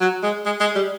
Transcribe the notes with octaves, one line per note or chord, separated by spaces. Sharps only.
F#3
G#3
G#3
G#3
G3